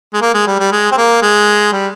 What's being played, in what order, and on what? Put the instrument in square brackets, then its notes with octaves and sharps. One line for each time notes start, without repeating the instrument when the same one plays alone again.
[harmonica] G#3
A#3
G#3
G3
G3
G#3
C4
A#3
G#3
G3